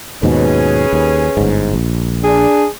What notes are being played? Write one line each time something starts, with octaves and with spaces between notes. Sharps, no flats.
D#2 G#2 B2 C#4 G#4 B4
D#2
G1 G#2
A#1
D4 G#4